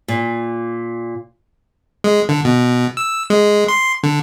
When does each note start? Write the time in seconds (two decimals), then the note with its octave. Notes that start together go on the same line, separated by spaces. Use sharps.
0.08 A#2
2.04 G#3
2.29 D3
2.45 B2
2.97 E6
3.30 G#3
3.68 C6
4.03 D3